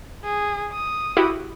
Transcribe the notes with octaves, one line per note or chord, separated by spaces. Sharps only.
G#4
D#6
E4 F#4 G4